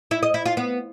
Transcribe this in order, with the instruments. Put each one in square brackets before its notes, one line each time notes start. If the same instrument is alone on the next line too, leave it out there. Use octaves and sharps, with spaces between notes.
[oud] E4
D#5
E4
F4
B3